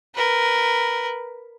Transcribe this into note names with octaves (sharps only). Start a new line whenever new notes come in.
A#4 B4